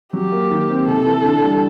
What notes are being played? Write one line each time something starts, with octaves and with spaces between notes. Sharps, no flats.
F#3 G4
A#3
D#3
C4
C3 A4
E3
D3
G3